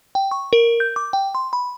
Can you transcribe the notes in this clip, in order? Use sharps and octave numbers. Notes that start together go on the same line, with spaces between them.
G5
C#6
A#4
G6
D6
G5
C6
B5